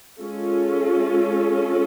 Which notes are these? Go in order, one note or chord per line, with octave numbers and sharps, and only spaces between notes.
G#3 C#4 F4 A4